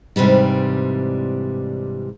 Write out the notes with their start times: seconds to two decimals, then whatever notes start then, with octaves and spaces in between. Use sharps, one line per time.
0.16 G#2 C3 E3 G3 D4